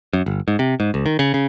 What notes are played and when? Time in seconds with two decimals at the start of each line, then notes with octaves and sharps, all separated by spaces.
0.13 F#2
0.26 G1
0.48 G#2
0.59 C3
0.80 G#2
0.94 C#2
1.06 D#3
1.19 C#3
1.34 C#3